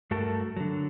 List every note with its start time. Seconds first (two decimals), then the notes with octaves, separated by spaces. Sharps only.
0.11 G2 A3 F#4 A4 A#4 A5
0.57 D3 F#3